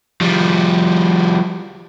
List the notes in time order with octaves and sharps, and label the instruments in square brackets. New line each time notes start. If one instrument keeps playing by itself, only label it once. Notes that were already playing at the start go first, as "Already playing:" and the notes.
[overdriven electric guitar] F3 G3